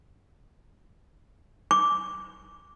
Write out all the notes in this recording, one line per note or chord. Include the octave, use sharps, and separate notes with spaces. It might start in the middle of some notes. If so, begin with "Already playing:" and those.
D6